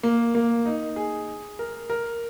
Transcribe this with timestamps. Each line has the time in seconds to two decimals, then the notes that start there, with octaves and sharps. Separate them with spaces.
0.03 A#3
0.35 A#3
0.65 D#4
0.96 G#4
1.59 A#4
1.90 A#4